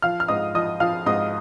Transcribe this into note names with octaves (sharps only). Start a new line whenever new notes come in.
F3 F5 F6
F6
G#2 D#5 D#6
F3 D#5 D#6
F3 F5 F6
G#2 D#5 D#6